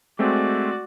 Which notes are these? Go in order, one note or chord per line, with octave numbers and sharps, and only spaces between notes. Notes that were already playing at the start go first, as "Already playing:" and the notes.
G#3 A3 C4 F#4 D5